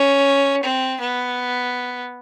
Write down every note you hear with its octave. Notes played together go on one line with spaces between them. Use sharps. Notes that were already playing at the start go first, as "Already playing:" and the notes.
Already playing: C#4
C4
B3